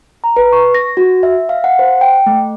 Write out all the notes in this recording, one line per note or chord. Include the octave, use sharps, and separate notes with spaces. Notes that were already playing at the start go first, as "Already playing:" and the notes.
A#5
B4
C#6
A#6
F#4
E5
F5
F#5
C5
G5
A3